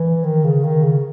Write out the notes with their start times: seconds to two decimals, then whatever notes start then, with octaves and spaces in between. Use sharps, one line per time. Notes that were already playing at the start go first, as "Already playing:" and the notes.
Already playing: E3
0.24 D#3
0.44 C#3
0.64 D#3
0.83 C#3